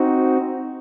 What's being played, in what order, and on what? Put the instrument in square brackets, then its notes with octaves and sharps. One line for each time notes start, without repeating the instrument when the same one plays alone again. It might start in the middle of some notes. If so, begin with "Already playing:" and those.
Already playing: [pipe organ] C4 D#4 F#4